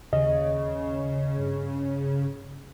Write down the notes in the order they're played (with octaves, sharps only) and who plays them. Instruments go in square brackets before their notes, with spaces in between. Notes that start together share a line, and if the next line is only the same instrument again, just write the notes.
[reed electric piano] D#2 D#5 [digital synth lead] C#3
[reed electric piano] G2